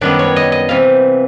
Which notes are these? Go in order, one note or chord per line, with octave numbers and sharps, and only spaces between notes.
F#2 D#3 G3 B3 D4
C#5
D#5
D#5
C3 E3 F5